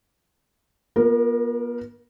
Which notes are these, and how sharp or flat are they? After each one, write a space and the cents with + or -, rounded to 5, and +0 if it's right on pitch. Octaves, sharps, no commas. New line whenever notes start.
B3 -45 F4 +10 A#4 +0